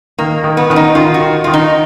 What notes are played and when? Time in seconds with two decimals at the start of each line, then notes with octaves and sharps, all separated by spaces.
0.19 D#3 A#3
0.44 D#3
0.57 B3
0.70 D#3 C#4
0.76 D#4
0.95 D#3 F4
1.14 F#4
1.20 D#3
1.44 D#3 F4
1.53 D#4